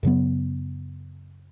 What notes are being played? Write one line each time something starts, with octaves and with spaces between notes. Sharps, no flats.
F#2 C#3 F#3 B3